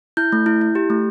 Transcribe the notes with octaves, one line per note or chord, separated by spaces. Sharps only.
E4 G6
A3
E4
E4
G4
A3